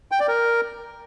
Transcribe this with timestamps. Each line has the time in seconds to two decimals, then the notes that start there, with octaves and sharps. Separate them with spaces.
0.12 G5
0.20 D5
0.28 A#4